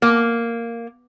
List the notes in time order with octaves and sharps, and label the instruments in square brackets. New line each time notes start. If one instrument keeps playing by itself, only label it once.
[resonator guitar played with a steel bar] A#3